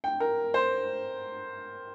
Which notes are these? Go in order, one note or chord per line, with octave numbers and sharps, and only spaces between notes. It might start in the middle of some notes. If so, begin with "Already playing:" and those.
G5
A#4
C5